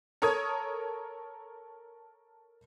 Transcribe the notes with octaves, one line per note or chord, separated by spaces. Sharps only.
A4 A#4 C#5 D#6 G#6